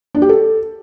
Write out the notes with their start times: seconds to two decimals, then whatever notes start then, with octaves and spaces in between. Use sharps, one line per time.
0.15 D4
0.22 G4
0.29 A4